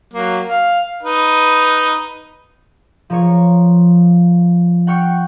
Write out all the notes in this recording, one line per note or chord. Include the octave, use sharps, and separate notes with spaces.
F#3 A#3
F5
D#4 B4
F3 A#4 C#5
F#5 G5 C#6 F6 C#7